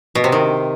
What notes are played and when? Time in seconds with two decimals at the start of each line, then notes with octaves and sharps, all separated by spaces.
0.15 B2
0.24 C3
0.32 D#3